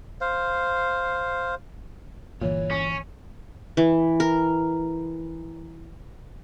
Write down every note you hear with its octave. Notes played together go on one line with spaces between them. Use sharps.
C5 F5
G1 A#2 E3 C#5
C#4
E3
A#4